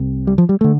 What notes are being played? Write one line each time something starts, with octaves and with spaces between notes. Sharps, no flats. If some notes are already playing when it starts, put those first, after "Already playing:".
Already playing: C2 C3
G3
F3
G3
D3 A3